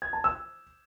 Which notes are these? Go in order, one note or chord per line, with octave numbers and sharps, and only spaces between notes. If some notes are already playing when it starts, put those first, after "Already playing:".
G#6
A5
E6